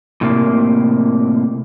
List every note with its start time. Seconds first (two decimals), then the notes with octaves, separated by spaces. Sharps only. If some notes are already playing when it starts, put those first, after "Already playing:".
0.21 A2 C3 A#3